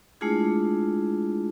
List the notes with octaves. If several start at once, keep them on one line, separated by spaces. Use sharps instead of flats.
G#3 A3 D4 E4 F4 G#4